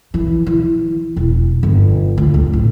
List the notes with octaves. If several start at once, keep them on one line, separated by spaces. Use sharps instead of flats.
E3
E3
E1
G1
D2
D2
A1